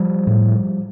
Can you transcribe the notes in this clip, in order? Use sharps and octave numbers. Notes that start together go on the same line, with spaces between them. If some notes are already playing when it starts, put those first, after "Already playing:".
Already playing: F3 G3
A2